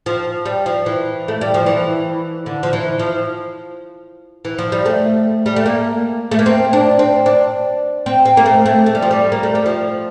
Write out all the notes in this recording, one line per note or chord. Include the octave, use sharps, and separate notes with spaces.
F3
G3
F3
E3
A3
G3
F3
E3
D3
F3
E3
F3
E3
F3
G3
A3
G3
A3
A#3
A3
A#3
C4
D4
C4
D4
C4
C4
A#3
A3
A3
A3
G3
F3
G3
A#3
A3
G3
F3